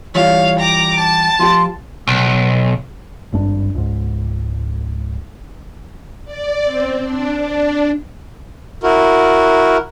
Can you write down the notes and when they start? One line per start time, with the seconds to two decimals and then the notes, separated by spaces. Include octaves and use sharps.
0.15 E3 G3 F4 C#5 F5
0.59 G5 A#5 D6
0.99 A5
1.39 F3 F4 G4 C6
2.07 B1
3.33 G#1 G2 D4
3.75 C#2 G#2
6.25 D5
6.64 C4
7.03 D4
7.40 D4
8.83 E4 F#4 A#4